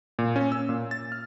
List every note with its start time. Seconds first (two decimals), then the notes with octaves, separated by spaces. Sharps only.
0.19 A#2
0.36 C#4
0.52 E6
0.69 A#2
0.91 A6
1.12 F6